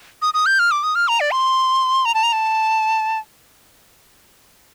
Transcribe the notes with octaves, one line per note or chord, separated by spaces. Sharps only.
D#6
D#6
G6
F6
D6
D#6
F6
A#5
D5
C6
A#5
A5
A#5
A5